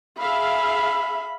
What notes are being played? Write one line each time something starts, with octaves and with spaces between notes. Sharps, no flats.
G#4 E5 F5 B5